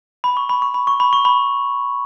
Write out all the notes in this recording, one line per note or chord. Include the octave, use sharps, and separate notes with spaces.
B5
C#6
B5
C#6
B5
C#6
B5
C#6
B5